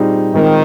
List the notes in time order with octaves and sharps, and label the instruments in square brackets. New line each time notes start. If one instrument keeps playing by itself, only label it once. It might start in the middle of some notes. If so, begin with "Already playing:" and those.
Already playing: [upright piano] A#2 G3 C4 D#4 G#4
[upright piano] A#2 G#3 C4 [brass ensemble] D#3